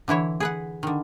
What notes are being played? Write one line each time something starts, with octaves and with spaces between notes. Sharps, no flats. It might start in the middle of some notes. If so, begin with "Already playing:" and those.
D3 E3 E4 C#5
G#4 B4 F#5
D3 D#3